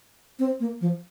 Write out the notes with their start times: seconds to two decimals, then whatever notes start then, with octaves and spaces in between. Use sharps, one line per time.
0.39 C4
0.60 A#3
0.81 F3